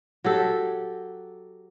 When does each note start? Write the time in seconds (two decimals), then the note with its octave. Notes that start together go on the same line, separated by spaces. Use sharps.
0.24 F#3 G4 A4